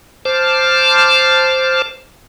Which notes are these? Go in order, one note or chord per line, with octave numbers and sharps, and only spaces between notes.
C5 A5 D6 F6